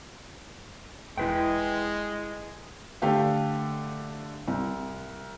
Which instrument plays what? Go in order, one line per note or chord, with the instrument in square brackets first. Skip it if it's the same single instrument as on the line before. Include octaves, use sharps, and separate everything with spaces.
[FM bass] E1 [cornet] G#3 [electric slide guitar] E4 B4 G5
[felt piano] D3 A3 G4 F5 G5
C2